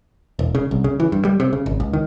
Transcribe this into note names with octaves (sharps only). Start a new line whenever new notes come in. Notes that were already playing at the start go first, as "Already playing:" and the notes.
E1
C#3
C2
C#3
E3
G2
G3
C3
C#3
G#1
C#2
D#3